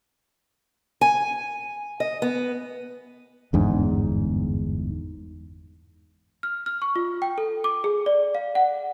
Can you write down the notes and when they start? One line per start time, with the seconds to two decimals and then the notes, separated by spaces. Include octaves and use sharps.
1.01 G#5
2.00 D#5
2.22 B3
3.53 G1 E2 G#2 D4
6.43 F6
6.66 F6
6.82 C#6
6.96 F4
7.22 G5
7.38 A4
7.64 D6
7.84 G#4
8.06 D5
8.35 F5
8.55 F#5